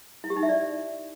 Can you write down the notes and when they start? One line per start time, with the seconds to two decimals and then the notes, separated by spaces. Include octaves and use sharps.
0.24 E4
0.30 G4
0.36 D#4
0.43 E5
0.49 D5